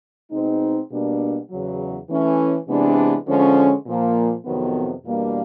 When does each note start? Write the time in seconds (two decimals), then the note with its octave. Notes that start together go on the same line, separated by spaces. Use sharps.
0.32 B2 G#3 C4 D#4
0.91 B2 G3 A#3 D4
1.50 E2 C#3 F#3
2.10 E3 A3 C#4
2.68 C3 E3 G#3 B3 D4
3.27 D3 F3 G#3 C#4
3.86 A#2 F3 A#3
4.44 F2 C3 D#3 F#3 B3
5.04 E2 B2 G3 A#3 D4